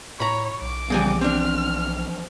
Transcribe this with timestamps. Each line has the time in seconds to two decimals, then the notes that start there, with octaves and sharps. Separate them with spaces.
0.20 A2 C#5 A#5 B5
0.61 B1 D6
0.90 C#3 E3 F3 G3 B3 G#5
1.21 C4 D4 F6